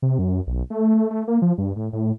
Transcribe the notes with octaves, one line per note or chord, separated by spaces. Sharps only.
C3
F#2
B1
A3
A3
A3
A#3
F3
G2
A2
A2